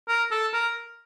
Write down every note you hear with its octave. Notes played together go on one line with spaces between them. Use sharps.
A#4
A4
A#4